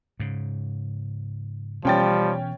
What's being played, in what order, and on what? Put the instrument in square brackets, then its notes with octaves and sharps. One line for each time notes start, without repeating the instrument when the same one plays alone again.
[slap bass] G#2 C#3
[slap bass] B2 E3 [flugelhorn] F3 [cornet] G3 [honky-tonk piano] C#4 G5 A6